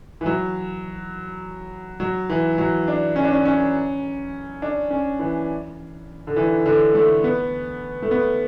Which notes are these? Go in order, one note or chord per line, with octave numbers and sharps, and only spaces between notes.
E3
F#3
F#3
E3
F#3
D4
C#4
D4
C#4
C#4
D4
C#4
E3
D3
E3
D3
A3
B3
A3
B3